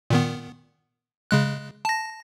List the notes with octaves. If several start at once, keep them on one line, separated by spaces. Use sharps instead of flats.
A#2 D#3 B3
C#3 G#3 F#6
A5 A#6